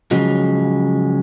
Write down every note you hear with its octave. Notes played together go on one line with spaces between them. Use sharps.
C#3 F3 F#3 G#3